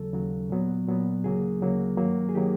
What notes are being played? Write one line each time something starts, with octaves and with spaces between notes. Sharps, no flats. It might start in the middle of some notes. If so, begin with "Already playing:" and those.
Already playing: D#2 C#3 F#3 A4
D#2 C#3 F#3
A#2 F#3 B3
A#2 F#3 B3
D2 C#3 F#3 A#3 G#4
D2 C#3 F#3 A#3
G2 D#3 F#3 A#3
G#4
D#3 F#3 A#3 G4